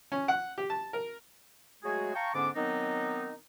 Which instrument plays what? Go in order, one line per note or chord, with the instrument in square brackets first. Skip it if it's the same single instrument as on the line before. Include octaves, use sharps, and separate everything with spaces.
[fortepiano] C#4
F#5
G4
A5
A#4
[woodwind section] F#3 G#3 A3 F#4 G#4
F5 G5 A5 A#5 C#6
G#2 D3 B3 C#4 D4 D6
D#3 F#3 B3 C4 D4 D#4